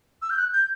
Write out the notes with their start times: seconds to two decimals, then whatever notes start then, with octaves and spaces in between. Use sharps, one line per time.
0.22 E6
0.30 G6
0.38 F#6
0.53 G6